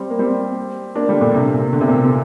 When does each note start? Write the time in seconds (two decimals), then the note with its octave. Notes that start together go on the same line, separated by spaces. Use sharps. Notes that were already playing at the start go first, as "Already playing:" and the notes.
Already playing: G3 C4
0.10 A#3
0.19 G3 C4
0.95 A#3 D4
1.09 D3 G3
1.21 A#2 D3
1.34 C3
1.53 A#2
1.73 D3
1.81 C3
1.88 A#2
1.96 C3